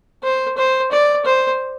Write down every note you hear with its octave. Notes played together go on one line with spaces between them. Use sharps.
C5
C5
D5
C5